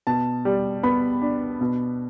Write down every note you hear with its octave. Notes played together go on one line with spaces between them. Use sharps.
B2 A5
G3
B3 B5
D4
B2